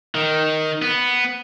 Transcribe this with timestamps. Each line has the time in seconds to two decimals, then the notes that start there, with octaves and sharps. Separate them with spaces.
0.15 D#3
0.82 B3